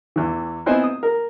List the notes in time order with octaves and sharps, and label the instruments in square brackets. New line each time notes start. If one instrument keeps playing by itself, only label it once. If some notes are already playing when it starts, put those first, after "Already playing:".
[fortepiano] E2 E3
B3 C4 E4 C5 D#5 G#5
D#6
A#4